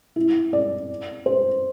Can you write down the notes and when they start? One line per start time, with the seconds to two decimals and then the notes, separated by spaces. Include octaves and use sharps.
0.16 E4
0.53 D5
1.26 C5